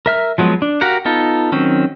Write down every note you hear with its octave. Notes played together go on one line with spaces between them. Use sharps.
A#4 E5 F6
F3 F#3 G#3 B3
D4
F#4 G4 A#4 F5 F#5
B3 D#4 F4 A4
D#3 F#3 C4 C#4